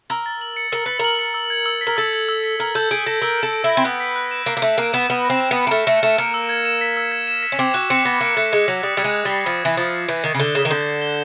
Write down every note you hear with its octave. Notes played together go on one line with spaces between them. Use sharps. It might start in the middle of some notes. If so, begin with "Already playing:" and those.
A#4 E6
A6
F#7
C#7
A#4 E6
B4 A6
A#4 F#7
C#7
E6
G#6
E6
B6
A#4
A4 E6
G#6
E6
B6
A#4 E6
A4 G6
G#4 D7
A4 A#6
A#4 E6
A4 G6
D7
E4
A#6
C4
B3 F#6
B6
F#6
E7
A#3 F#6
A#3
A3 B6
A#3 F#6
B3 E7
B3 F6
A#6
C4
E7
B3
C#7
A#3
A3 F6
A3 A#6
A3 E7
A#3 C#7
E6
G#6
E7
B6
E6
G#6
E7
B6
C#4
C4 D6
F#4 F#6
C4 C#7
B3 A#6
A#3 D6
A3 F#6
G#3 C#7
F#3 A#6
G3 D#6
G3 G#6
G#3
D#6
G3
C7
F3 D#6
E3 G#6
F3 D#6
C7
E3 G6
D#3 C7
C#3
D3 G7
C#3 E7
D#3
D3 G6
C7
G7